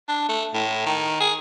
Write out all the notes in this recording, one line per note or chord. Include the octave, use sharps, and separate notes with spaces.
D4
A3
A2
D#3
G#4